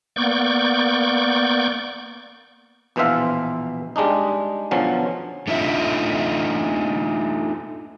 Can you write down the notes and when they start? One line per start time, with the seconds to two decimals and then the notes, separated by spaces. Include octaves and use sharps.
0.16 A#3 B3 D5 C#6 G6
2.96 A#1 B2 E3 C5 E5 F5
3.96 G3 G#3 D4 D#4
4.71 B2 D3 F3 F#3 C#4
5.48 A3 D4 D#4 F4 E5